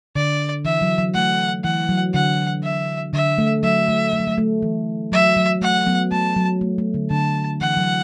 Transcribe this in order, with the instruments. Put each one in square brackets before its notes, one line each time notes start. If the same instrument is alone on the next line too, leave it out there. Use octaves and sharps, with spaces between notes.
[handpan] D3 [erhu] D5
[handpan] E3 [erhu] E5
[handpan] F#3
F#3
[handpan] A3 [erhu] F#5
[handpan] E3 [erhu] F#5
[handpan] F#3
[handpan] D3 [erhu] F#5
[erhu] E5
[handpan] D3 [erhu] E5
[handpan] A3
[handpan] F#3 [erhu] E5
[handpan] A3
A3
F#3
A3
A3
E3
[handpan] F#3 [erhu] E5
[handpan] F#3
[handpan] A3 [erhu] F#5
[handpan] F#3 B3
[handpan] A3 [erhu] A5
[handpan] F#3
A3
A3
D3
[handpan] D3 [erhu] A5
[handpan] E3 [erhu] F#5
[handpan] F#3